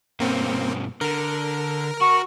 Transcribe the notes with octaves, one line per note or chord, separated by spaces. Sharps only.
G2 B2 A#3 C4 C#4
D3 A#4
F#4 C#6